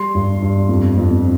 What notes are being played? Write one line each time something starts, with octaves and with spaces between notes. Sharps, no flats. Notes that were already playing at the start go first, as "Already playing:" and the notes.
Already playing: G3 C6
G2
G2
F2
F2